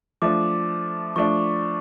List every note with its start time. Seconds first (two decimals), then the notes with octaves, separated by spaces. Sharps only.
0.22 F3 A3 D4 D6
1.16 F3 A3 D4 C#6